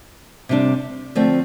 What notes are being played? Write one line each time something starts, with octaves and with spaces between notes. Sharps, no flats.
C3 G3 D4
D3 F3 A3 C4